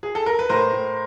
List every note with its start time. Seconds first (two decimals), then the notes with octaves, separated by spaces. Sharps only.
0.03 G#4
0.15 A4
0.26 A#4
0.39 B4
0.49 A2 A#4 C5
0.72 A2